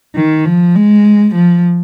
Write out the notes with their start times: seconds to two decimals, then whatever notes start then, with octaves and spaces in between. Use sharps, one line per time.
0.16 D#3
0.46 F3
0.76 G#3
1.35 F3